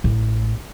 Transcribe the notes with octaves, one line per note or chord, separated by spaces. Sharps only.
A1